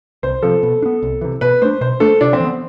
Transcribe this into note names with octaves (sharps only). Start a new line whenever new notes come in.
C2 C5
C3 F3 A4
B2
D4
B3
C2
C3 E3
B2 B4
A3 D4 C5
B2 C5
A3 D4 A4
C3 D4
C4
E3 B3